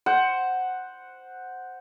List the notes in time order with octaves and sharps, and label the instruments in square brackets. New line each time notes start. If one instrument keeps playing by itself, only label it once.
[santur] C5 F#5